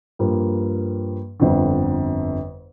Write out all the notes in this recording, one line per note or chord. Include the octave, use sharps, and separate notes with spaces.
G2 F3 A#3
G1 F2 D3